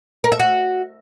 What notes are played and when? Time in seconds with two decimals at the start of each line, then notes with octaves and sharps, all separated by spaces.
0.24 A#4
0.32 E5
0.39 F#4